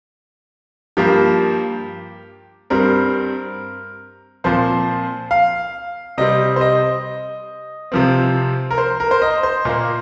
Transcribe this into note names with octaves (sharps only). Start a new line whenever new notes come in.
G2 F3 A#3 G4
G2 G3 C4 A#4
A#2 F3 C4 C5
F5
C3 G3 C4 D#5
C5
D#5
C3 F3 C4
A#4
C5
A#4
C5
D#5
C5
A#2 A#3